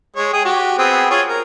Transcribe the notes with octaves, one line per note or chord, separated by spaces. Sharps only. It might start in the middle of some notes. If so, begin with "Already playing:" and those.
G#3 C#5
G#4 G5
F#4 G4
B3 C4 G#4
F4 G#4 C#5
A#4